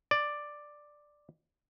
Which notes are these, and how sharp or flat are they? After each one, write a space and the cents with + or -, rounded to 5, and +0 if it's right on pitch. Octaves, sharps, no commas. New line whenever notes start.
D5 +5